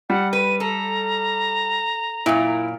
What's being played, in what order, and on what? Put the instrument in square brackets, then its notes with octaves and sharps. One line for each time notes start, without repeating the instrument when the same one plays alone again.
[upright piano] G3 [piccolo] F#5
[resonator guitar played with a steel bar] B4 [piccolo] D#7
[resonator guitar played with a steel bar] A4 [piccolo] A#5
[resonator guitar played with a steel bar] F#2 A#2 [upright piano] E4